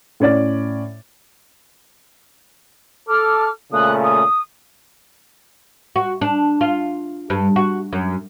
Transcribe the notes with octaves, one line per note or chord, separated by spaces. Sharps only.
A2 C#4 D5 A6
A4 D6 F6
A#2 C#3 A3 D#6 F#6
D#6
F#4
D4
F4
G2
F#4
F#2